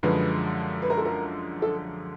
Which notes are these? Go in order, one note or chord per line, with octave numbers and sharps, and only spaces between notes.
F#2 D3 F3 G#3 B4
B4
A#4
A4
A#4
A4